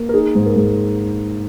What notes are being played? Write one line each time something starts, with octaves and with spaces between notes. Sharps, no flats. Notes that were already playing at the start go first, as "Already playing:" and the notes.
Already playing: A#3
A#4
D#4 G#4
G#2
A#4
G#2